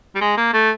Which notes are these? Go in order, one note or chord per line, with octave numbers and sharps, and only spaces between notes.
G3
G#3
A#3
A3